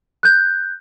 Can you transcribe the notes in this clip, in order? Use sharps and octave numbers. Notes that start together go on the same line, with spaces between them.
F#6 G6